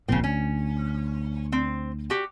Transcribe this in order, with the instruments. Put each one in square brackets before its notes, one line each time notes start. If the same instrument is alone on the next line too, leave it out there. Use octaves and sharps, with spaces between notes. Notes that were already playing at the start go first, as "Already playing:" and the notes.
[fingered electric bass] D1 A#1 A#2 [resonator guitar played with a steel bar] C#3 C4
[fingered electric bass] D2 [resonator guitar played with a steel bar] C#4
[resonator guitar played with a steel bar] C4
F#4 G4